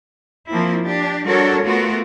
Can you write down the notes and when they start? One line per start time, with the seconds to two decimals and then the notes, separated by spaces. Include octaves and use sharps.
0.49 F3 A#3 C4 E4
0.82 D4 G4
1.24 G3 D4 F#4 A4 A#4 C#5
1.63 A3 B3 F4 F#4 A#4